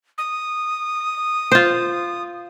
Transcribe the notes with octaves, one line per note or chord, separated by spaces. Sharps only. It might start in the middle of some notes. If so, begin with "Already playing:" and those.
D#6
F4 C5